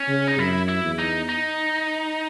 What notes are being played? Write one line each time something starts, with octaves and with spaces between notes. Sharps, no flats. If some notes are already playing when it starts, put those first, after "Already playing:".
Already playing: C#4
C#3
D#4
F#2 E4
E4
E2
D#4
D#4